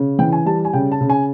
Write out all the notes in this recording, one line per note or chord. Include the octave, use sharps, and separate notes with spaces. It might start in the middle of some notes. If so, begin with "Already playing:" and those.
Already playing: C#3
E3 G5
G#5
G3 A5
G#5
C#3 G5
A5
C#3
G#5